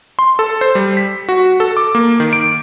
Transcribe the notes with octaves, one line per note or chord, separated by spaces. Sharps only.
C6
A4
C5
G3
B6
F#4
A4
D6
A#3
D#3
D7